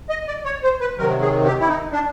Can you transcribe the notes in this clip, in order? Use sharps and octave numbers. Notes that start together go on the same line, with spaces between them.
D#5
D5
C#5
C5
B4
C3 D#3 F#3 A#4
G#4
G4
E4
D#4
D4